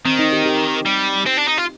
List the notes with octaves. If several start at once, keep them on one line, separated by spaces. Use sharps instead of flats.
D#3 C4
D#4
G4
G4
G3
C4
D4
D#4
F4